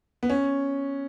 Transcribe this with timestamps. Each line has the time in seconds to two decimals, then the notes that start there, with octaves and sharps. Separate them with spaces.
0.23 B3
0.30 C#4